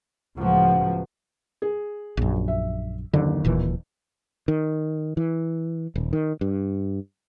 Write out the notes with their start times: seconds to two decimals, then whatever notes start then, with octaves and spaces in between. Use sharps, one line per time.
0.37 C#2 A2 F3 F#3 B3
1.62 G#4
2.17 A#1 F#2
2.48 E5
3.13 F#1 D#2 D3
3.45 D1 A#2 E3
4.48 D#3
5.17 E3
5.96 D#1
6.13 D#3
6.41 G2